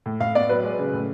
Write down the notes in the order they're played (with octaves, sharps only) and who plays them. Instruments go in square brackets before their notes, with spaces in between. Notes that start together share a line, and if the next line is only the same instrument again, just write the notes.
[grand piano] A2
[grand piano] A2 [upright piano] F5
[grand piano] B3 [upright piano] D5
[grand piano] F#3 [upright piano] B4
[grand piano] G#3
C#3
A2